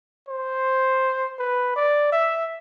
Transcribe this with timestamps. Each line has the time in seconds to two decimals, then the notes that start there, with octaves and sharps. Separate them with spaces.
0.28 C5
1.39 B4
1.76 D5
2.12 E5